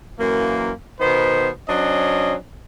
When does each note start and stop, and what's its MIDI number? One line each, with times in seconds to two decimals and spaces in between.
0.20 0.71 42
0.20 0.71 52
0.20 0.71 58
1.01 1.49 47
1.01 1.49 51
1.01 1.49 59
1.01 1.49 72
1.69 2.35 54
1.69 2.35 61
1.69 2.35 62
1.69 2.35 72
1.69 2.35 75